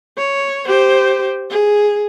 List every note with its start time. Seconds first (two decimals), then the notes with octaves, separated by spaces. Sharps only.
0.17 C#5
0.66 G4 C5
1.50 G#4